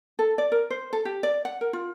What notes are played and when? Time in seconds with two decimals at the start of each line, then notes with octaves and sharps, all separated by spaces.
0.19 A4
0.38 D5
0.52 A#4
0.70 C5
0.93 A4
1.05 G4
1.23 D5
1.45 F#5
1.61 A#4
1.73 F4